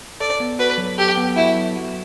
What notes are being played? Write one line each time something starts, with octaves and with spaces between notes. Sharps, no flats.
A4 D5
B3
F#4 B4
F#3
G4 A4
B3
E4 F#4
F#3
F#4